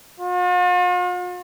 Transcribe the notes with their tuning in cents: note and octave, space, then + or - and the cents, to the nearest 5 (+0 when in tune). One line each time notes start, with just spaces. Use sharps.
F4 +45